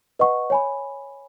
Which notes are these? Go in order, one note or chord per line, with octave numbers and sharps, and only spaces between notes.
B4 D#5 F#5 C#6
C#5 G#5 B5